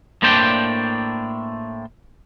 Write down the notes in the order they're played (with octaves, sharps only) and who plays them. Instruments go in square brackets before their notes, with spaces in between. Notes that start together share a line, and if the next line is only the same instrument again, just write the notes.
[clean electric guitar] A2 A#3 D4 C5 D5 G5